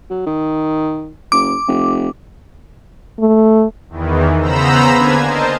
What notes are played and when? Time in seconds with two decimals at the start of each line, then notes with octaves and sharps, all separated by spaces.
0.10 F#3
0.27 D#3
1.32 F#1 D6
1.68 F1
3.19 A3
3.89 E2 D#3 E3
4.39 C#3 B3 C5 A#5 B5 E6
4.95 D3 A#3 D4 B4 G#5 G#6
5.25 A#4 C5 D#5 A5